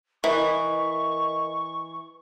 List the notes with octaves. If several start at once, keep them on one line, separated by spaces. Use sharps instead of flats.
E3 A#4 B4 D#5 C#6